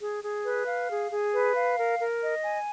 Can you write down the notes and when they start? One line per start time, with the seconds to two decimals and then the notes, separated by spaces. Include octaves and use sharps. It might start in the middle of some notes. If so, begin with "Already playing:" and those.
0.01 G#4
0.23 G#4
0.45 B4
0.67 F5
0.90 G#4
1.12 G#4
1.33 B4
1.56 F5
1.78 A#4
1.99 A#4
2.22 D#5
2.44 G#5